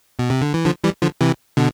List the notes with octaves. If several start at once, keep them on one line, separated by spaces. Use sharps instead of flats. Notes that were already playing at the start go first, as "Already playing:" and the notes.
B2
C3
D3
E3
D3 F3
E3 G3
D3 F3
C3 E3
B2 D3